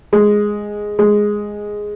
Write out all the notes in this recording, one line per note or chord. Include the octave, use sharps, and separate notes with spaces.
G#3
G#3